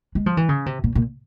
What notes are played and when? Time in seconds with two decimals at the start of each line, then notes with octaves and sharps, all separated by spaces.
0.15 G#3
0.26 F3
0.37 E3
0.49 C#3
0.66 C3
0.84 A#2
0.95 A#2